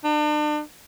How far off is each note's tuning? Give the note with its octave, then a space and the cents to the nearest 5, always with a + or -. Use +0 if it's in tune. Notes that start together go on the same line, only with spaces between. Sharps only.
D4 +40